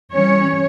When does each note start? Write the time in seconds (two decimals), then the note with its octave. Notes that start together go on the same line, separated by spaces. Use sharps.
0.11 E3 G3 C#4 C#5